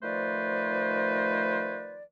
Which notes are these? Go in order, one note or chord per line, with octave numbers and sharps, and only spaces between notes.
D#3 F3 A3 B4 C5 D5